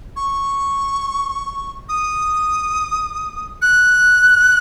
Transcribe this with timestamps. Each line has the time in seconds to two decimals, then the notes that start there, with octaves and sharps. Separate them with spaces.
0.16 C#6
1.89 D#6
3.62 F#6